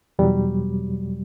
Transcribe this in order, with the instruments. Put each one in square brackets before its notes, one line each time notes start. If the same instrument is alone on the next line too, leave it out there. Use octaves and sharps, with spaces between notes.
[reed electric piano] E2 B2 F#3 G3